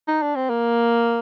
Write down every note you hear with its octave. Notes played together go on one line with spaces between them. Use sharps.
D#4
D4
C4
A#3